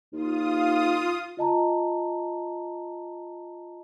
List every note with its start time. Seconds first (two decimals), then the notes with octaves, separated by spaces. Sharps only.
0.13 D#2 F4 D#6
1.37 F4 D#5 A5 A#5